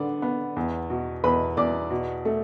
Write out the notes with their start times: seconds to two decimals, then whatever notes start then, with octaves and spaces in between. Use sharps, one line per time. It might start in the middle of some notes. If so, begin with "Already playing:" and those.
Already playing: D3 B3 D5
0.22 B3
0.56 E2
0.90 B2
1.24 E2 B4 B5
1.57 E2 D5 D6
1.90 B2
2.25 A3